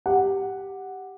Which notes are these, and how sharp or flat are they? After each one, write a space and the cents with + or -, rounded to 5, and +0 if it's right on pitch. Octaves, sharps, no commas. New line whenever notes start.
G4 +0 F#5 +0